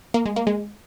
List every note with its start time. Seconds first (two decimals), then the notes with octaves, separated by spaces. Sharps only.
0.14 A#3
0.26 G#3
0.36 A#3
0.47 G#3